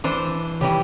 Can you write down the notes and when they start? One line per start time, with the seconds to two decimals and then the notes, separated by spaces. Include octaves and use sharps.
0.04 E3 D4 C5
0.61 C3 D#3 E3 G3 G4 C#5